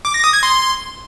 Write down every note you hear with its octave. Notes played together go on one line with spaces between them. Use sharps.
D6
A#6
D#6
G#6
C6